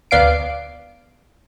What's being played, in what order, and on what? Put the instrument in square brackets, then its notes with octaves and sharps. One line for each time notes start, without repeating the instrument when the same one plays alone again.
[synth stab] D2 B3 D5 F5 C7 D7